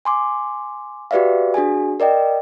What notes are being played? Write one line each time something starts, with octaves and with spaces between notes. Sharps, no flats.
G#5 C6 D6
F#4 G4 B4 D5 E5 F5
D4 F#4 G#4 G#5
A#4 D5 D#5 G5